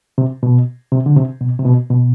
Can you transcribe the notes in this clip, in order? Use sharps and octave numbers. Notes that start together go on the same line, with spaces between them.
C3
B2
C3
D3
C3
B2
C3
B2
B2